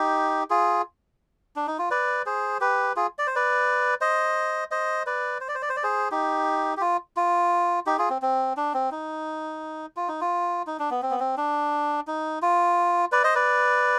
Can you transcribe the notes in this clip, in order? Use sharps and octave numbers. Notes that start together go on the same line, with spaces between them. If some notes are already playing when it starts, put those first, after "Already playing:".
Already playing: D#4 G4
F4 G#4
D4
D#4
F4
B4 D5
G#4 C5
G4 B4
F4 G#4
D5
C5
B4 D5
C5 D#5
C5 D#5
B4 D5
C5
D5
C5
D5
C5
D5
G#4 C5
D#4 G4
G4
F4
F4
D#4 G4
F4 G#4
C4
C4
D4
C4
D#4
F4
D#4
F4
D#4
D4
B3
C4
B3
C4
D4
D#4
F4
B4 D5
C5 D#5
B4 D5